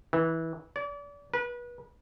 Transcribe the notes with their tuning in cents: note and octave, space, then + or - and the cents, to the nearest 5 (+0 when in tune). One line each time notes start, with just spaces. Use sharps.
E3 -20
D5 -35
B4 -30